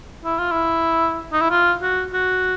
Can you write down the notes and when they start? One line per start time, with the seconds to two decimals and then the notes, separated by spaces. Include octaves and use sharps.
0.25 E4
0.39 F4
0.51 E4
1.32 D#4
1.41 E4
1.50 F4
1.82 F#4
2.13 F#4